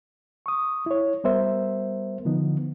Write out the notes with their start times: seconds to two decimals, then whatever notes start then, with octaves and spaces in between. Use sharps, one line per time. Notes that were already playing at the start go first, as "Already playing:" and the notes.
0.46 C#6 D#6
0.86 E4 C#5
1.24 G3 B3 A#4 C5 E5
2.25 D3 F3 B3 D#4